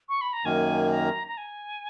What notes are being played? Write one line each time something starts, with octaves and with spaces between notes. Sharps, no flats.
C#6
B5
A#5
F#2 D#3 A#3 G#5
A#5
A#5
G#5